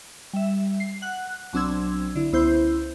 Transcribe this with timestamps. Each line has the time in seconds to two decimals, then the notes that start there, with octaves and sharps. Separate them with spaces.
0.33 G3 E5
0.80 C7
1.02 F#5 F#6
1.53 B1 F#3 C4 D4 E6 G#6
2.16 D3 E4
2.33 C#2 B3 E4 C5 G6